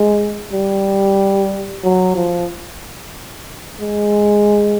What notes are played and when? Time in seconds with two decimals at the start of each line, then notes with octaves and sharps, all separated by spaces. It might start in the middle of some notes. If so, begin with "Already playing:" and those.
Already playing: G#3
0.52 G3
1.84 F#3
2.16 F3
3.80 G#3